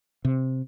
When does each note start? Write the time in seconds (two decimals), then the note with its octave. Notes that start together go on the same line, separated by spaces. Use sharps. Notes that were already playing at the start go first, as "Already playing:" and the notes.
0.25 C3